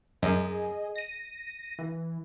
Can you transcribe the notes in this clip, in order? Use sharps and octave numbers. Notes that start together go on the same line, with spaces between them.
F#2 G#4 D#5
A#6 D#7
E3